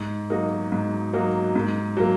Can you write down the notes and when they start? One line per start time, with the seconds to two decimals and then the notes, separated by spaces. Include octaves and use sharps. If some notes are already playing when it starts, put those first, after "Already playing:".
Already playing: G#2
0.30 F#3 A#3 D#4 F#4
0.72 G#2
1.14 F#3 A#3 D#4 F#4
1.55 G#2
1.97 F#3 A#3